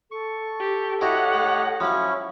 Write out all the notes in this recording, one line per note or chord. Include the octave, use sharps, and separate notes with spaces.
A4 C#6
G4
E4 F#4 G4 C#5 D#5 F#5
A2
F3 F#3 C#4 E4 C#6